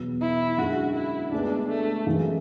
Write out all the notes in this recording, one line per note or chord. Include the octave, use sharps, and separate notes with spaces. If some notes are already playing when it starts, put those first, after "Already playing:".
Already playing: E2 B2 F#3 B3
E4
F#2 D3 G#3 F#4
E4
D2 D3 G#3 B3 D4
A3
F#2 E3 G#3